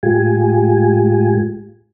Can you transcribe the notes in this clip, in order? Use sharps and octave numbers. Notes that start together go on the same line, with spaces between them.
A2 G#3 F4 G4 G#5